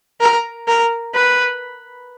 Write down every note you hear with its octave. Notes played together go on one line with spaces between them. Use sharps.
A#4
A#4
B4